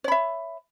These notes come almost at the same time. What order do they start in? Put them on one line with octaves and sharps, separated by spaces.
C#5 B5 E5